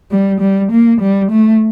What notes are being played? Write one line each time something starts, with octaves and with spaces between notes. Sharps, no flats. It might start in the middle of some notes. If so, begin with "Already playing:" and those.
G3
G3
A#3
G3
A3